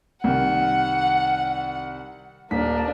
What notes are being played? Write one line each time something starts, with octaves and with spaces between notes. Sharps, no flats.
C2 D#3 F#5
D#1 A#3 D4 B6